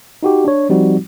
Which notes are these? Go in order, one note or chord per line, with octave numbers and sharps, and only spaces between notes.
D#4 F#4 G4
D4 C#5
F3 G3 C4 D#4 F#4